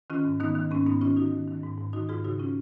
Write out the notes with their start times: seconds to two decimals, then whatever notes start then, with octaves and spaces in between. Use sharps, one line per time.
0.10 D#3 C#4 F4
0.25 G#2
0.40 D#3 B3 D#4
0.55 D#3
0.71 G#2 A#3 C#4
0.86 G#2 B3 D#4
1.01 D#3 C#4 F4
1.17 D#3 D#4 F#4
1.32 D#3
1.47 D#3
1.63 G#2
1.78 G#2
1.93 D#3 D#4 F#4
2.09 G#2 F4 G#4
2.24 C#3 D#4 F#4
2.39 C#4 F4